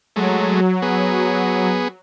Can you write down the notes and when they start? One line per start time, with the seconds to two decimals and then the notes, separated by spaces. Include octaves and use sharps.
0.16 F#3 G#3 A3
0.82 B3 G#4